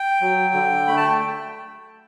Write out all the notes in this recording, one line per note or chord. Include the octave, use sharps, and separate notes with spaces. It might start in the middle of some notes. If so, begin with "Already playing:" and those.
Already playing: G5
F#3
D3
A3 B5
A5
G5